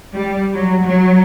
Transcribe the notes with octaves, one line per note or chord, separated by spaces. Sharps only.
G3
F#3
F#3